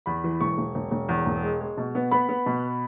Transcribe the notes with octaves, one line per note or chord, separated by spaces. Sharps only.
E2 B5
E3
E1 C#6
E1
E1
E1
E2
E1
G#3
G#3
B2
B3
B3 B5
B3
B2